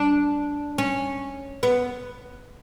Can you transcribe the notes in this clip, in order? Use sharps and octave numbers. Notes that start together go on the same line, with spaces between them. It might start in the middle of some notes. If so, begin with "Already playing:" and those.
Already playing: D4
C#4
B3